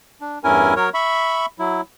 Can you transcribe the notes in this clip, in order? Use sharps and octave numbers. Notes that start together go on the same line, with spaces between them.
D4
E2 G2 C#4 E4 A#4 G#5
F#3 A#4 C#5
E5 B5 C#6
F#3 E4